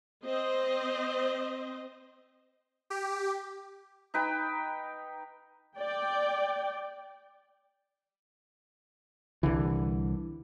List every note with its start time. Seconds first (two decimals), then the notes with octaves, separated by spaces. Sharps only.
0.24 C4 C5 D#5
2.90 G4
4.14 D#4 B4 G5
5.78 D5 G5
9.43 C2 D3 E3